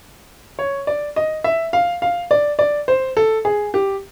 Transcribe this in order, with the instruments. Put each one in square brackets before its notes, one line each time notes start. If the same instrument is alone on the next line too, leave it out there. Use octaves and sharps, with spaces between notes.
[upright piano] C#5
D5
D#5
E5
F5
F5
D5
D5
C5
A4
G#4
G4